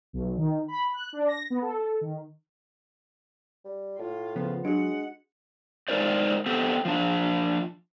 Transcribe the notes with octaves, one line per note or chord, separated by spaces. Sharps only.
B1
D#3
B5
F#6
D4
A#6
B3
A4
D#3
G3
A2 F4
C#3 F3 B3
F#3 G#3 D4 F#4 F#5
G#3 D#4 A#4 C5 D5
B3 C4 G4 A4
F3 D4